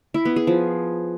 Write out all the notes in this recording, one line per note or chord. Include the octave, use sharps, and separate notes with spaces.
E4
B3
G#4
F3